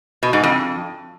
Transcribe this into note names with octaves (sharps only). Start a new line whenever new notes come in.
B2
G#2
F2